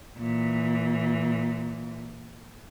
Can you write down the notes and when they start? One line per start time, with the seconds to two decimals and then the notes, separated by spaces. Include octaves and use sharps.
0.19 A#2 E3